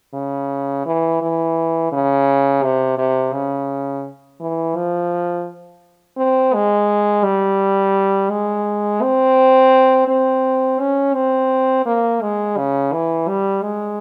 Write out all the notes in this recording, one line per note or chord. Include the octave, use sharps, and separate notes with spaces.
C#3
E3
E3
C#3
C3
C3
C#3
E3
F3
C4
G#3
G3
G#3
C4
C4
C#4
C4
A#3
G#3
C#3
E3
G3
G#3